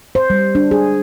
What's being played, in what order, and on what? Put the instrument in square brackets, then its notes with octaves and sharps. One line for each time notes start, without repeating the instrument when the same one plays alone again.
[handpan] C5
G3
D4
G#4